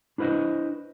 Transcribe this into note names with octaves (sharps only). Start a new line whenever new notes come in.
D4 E4 B4 C5 D#5